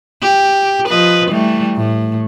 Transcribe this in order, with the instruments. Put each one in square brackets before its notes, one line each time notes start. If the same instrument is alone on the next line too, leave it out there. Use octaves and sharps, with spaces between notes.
[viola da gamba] G4
F3 B4 D#5
E3 G3 A3
A2